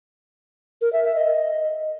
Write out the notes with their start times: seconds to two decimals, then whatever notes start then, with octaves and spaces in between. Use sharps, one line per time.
0.81 A#4
0.93 E5
1.04 E5
1.16 D#5